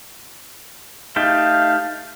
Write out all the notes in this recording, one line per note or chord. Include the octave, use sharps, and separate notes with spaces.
A3 D#4 G4 F5